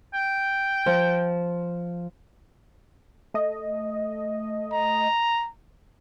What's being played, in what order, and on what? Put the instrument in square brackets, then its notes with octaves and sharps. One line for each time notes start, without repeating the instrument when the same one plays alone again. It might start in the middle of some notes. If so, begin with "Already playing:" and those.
[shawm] G5
[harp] F3
[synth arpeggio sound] A3 D#5
[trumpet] A#5